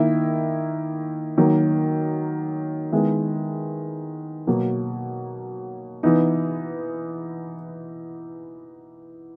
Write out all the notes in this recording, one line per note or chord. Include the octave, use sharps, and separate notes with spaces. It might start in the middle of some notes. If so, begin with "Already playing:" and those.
Already playing: D#3 A#3 E4
D#3 F#3 A#3
D#3 G#3 B3 E4
B2 F#3 A#3
E3 B3 D#4